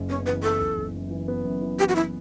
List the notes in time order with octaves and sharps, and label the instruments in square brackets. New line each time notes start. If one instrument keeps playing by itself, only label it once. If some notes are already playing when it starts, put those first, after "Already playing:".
Already playing: [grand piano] F#1 F#2
[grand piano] B3 [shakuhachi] C#4
[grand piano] E3 [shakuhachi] B4
[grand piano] E3 [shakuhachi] A4
[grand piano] F#1
F#1
F#2
E3
B3
F#2
E3
[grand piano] E3 [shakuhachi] G4
[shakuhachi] F#4
E4